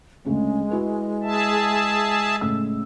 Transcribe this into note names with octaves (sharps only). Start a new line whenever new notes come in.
D2 C#3 G#3 C#4
E4 F#4 B4
G#4 E5 A5
A2 C#3 E6